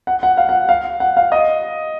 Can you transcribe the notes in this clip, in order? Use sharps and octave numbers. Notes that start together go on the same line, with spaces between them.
F#5
F#5
F5
F#5
F5
F#5
F5
D#5